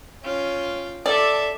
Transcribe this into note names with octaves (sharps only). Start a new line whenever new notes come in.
C#4 F4 G5
A4 D5 E5 A5 D6